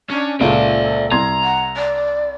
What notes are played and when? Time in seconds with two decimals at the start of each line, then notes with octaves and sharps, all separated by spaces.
0.10 C#4 D4
0.41 C#2 A#2 A4 D5 E5
1.12 C2 A#5 C6 G#6
1.44 F#5
1.77 D5